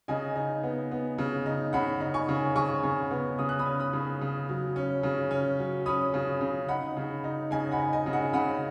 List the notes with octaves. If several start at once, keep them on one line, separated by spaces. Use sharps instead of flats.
C#3 D#5 G#5
D#4
B3
B3
C#3
D#4
C#3 F#5 B5
D#4
G#5 C#6
C#3
C#3 G#5 C#6
C#3
B3
C#3 D#6
F#6
B5 D#6
C#4
B5 D#6
C#3
C#3
F#3
C#4
C#3
C#4
F#3
C#4 B5 D#6
C#3
C#3
D#4 F#5 B5
C#3
D#4
C#3 D#5 G#5
F#5 B5
D#4
D#5 G#5
C#3
F#5
C#3 F#5 B5